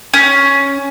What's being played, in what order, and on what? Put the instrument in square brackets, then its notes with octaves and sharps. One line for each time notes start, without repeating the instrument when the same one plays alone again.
[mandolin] C#4